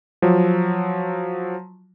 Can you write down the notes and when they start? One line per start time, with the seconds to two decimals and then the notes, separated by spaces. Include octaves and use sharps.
0.22 F3 F#3